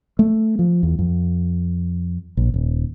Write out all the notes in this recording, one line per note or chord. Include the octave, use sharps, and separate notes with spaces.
A3
F3
E2
F2
A#1
D#1